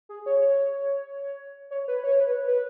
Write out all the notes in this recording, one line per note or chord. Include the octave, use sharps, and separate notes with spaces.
G#4
C#5
C#5
C#5
B4
C#5
B4
B4